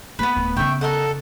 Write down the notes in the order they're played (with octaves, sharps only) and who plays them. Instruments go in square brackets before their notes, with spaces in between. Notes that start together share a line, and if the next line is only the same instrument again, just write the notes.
[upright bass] A#3 [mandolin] B3 B4
[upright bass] D1
[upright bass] C#3 B3 [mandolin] E5 G5 [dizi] C#6
[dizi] A4 [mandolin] A#4 D#5 F#5